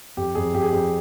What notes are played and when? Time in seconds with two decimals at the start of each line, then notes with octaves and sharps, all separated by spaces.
0.17 F2 G4
0.35 F2 G#4
0.54 F2 G4
0.62 G#4
0.70 F2 G4